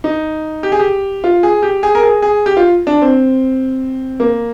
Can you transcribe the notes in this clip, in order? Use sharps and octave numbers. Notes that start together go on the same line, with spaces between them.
D#4
G4
G#4
G4
F4
G#4
G4
G#4
A#4
G#4
G#4
G4
F4
D4
C4
A#3